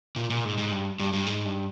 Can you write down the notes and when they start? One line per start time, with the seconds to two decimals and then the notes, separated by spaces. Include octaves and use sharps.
0.16 A#2
0.30 A#2
0.45 G#2
0.58 G#2
0.71 G2
1.00 G2
1.13 G2
1.27 G#2
1.45 G2